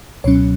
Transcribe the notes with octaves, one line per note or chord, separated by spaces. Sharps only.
C#2 B2 F#3 C#4 C#5